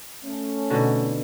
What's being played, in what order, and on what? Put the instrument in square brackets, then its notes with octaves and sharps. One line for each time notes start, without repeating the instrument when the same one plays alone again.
[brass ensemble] A3 C#4
[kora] B2 D3 D#4